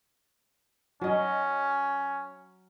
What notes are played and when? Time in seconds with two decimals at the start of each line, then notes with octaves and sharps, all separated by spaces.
1.01 F#3 C#4 D#5